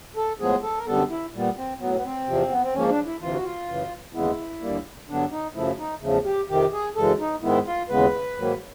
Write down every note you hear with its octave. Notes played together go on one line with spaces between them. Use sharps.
A4
A2 F3 G#3 B3 G#4
A4
A#4
F#2 D3 G3 B3 A4
E4
A#2 G3 B3
C4
A2 F#3 B3
B3
C4
E2 C3 F3
B3
C4
G#2 F3 A#3 C#4
D4
E4
D2 C3 E3 F4
F#4
F4
F#2 C#3 E3
D#2 C#3 E3 G#3 B3 E4
D#2 D3 G3 A#3
G2 D3 F#3 B3 D4
D#4
F#2 C#3 F3 A3 E4
D#4
E2 C#3 F3 A3
G4
F2 C3 D#3 G4
G#4
F#2 C#3 E3 G#3 A4
D#4
G#2 D#3 G#3 B3 E4
F4
D#2 C#3 E3 G#3 B3 B4
G#2 D#3 F#3 A#3